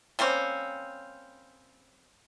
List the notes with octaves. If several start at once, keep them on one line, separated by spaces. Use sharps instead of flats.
G3 A#3 C4 C#4